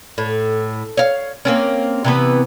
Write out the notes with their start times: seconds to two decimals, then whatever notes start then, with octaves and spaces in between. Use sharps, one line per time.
0.18 A2
0.97 C#5 F5
1.45 A#3 C4 C#4
2.04 C3 E3 B3